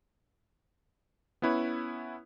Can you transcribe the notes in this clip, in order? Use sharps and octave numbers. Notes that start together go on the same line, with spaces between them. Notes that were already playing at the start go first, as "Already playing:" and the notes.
B3 C#4 E4 B4 C#5